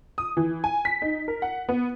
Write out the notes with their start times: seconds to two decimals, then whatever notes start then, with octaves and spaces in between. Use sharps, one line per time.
0.18 D#6
0.37 E3
0.64 G#5
0.85 B6
1.02 D#4
1.28 A#4
1.42 F#5
1.69 B3